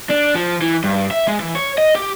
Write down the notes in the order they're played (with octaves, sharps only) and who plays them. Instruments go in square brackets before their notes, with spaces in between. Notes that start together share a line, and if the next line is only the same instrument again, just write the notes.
[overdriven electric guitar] D4
F3
E3
G2
E5
G#3
E3
C#5
D#5
G4